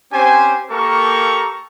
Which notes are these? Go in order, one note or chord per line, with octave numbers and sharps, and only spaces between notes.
C4 C#4 G4 C5 G#5
A#3 G4 A4 A#4 A#5 C#6